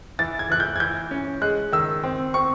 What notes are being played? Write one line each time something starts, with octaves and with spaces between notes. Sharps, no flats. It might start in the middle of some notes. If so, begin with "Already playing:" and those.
E3 A6
G#6
E3 F#6
G6
G#6
E3 G6
C#4
G#3 F#6
D#3 E6
C4
C4 C#6